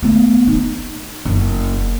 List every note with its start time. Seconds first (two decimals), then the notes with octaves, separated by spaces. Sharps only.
0.03 A3 B3
0.47 D#4
1.25 F#1 C#3